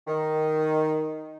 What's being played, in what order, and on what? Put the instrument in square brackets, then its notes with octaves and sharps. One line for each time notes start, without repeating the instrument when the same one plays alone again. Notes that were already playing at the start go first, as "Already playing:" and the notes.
[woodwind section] D#3